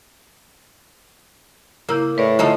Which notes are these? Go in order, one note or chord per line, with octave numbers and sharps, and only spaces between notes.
C#3 A#3 E4 G6
A2 B4 C#5 D5
D3 F3 D#4 A4